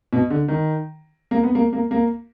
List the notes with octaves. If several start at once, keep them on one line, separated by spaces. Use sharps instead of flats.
B2
D3
D#3
A#3
B3
A#3
A#3
A#3